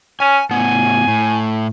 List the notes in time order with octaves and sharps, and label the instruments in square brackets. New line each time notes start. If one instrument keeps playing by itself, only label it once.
[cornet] C#4 [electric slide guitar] G#5
[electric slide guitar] A2 B3 F#5 [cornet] G#5
[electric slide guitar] A2